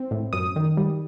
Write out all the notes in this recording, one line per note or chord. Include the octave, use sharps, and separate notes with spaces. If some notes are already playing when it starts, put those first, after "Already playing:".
Already playing: C4
A2
F#2 D#6
D#3
G3